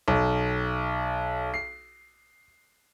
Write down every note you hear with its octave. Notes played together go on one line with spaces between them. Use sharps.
B1
C7